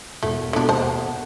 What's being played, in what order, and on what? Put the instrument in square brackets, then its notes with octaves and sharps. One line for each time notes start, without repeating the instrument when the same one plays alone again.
[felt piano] E1 [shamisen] A3
[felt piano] B2 A#5 [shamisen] D3 D4
[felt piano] D#2 [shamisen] C5 A5
[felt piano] F#5